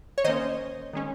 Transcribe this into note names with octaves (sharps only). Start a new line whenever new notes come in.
C#5
D#3 A#3 C#4 C5 D#5
D#3 G#3 C#4